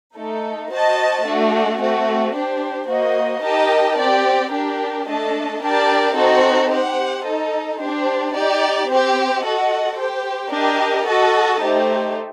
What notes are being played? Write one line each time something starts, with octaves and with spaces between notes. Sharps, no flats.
A3 D#4 A4
F#4 C5 D#5 A5
A3 D4 F#4
A3 C4 F#4
D4 G4 C5
A#3 F#4 C5 D#5
D#4 G4 A#4 D#5 A5
C4 G4 D5
D4 G4 A#4
A3 D4 A4 D#5 A5
D4 G4 A#4 D5 A5
C4 D#4 F#4 A4
G4 C5 F#5
D#4 A4 D#5
D4 G4 C5
D#4 G4 D5
C4 G4 C5 G5
F#4 A4 D#5 F#5
G4 C5 G5
D4 G4 A#4 D#5
F#4 A4 D#5 A5
A3 D#4 G4 C5